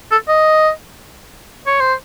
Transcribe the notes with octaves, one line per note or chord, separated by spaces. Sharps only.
A4
D#5
C#5
C5